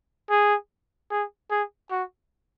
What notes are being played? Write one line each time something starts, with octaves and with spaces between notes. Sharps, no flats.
G#4
G#4
G#4
F#4